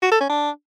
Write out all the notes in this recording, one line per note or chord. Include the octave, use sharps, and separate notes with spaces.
F#4
A4
C#4
D4